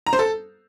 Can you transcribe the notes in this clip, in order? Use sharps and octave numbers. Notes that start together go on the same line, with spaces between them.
A#5
C5
A4